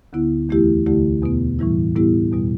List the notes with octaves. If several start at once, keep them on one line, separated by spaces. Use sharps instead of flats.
D2 D3 B3 E4
E2 E3 A3 E4 G4
D2 D3 A3 E4 G4
E2 B2 B3
A2 E3 G3 E4
A2 G3 B3 E4 G4
E2 B2 G3